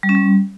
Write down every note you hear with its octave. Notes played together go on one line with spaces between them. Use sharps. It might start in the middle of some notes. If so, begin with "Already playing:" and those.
G3
C#4
G3